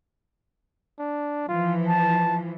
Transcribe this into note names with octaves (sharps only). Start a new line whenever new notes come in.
D4
E3 F3 F4
A5